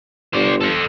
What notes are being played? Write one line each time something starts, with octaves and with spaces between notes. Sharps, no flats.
G1 C5 D5
A4 C5